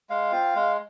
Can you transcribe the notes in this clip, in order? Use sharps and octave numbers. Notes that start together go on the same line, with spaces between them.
G#3 F5
C4 F4
G#3